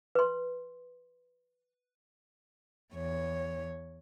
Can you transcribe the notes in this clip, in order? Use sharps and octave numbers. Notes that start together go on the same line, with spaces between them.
B4 C6
E2 C#5